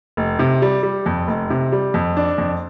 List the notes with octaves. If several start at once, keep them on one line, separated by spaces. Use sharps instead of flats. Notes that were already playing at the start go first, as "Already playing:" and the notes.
F1
C3
G3
G3
F2
F1
C3
G3
F2
D4
F2